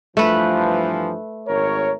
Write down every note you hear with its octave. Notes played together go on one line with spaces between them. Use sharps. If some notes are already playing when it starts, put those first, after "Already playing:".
G2 E3 F3 A3 B4
G#1 A#4 C#5